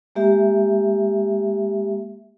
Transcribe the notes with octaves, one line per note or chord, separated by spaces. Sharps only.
G#3 A#3 G4 E5